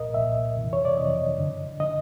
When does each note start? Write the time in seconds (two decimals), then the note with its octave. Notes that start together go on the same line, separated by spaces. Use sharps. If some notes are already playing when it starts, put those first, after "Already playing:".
Already playing: C2 A#2 A#4 D#5
0.13 C2 A#2 E5
0.56 F2 C3 E3
0.73 C#5
0.85 D5
0.97 F2 C3 E3 D#5
1.38 F#2 D3
1.80 D3 D#5